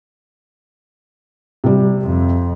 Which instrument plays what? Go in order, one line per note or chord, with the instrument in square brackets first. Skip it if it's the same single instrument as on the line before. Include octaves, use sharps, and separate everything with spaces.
[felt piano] C3 G3
[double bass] F2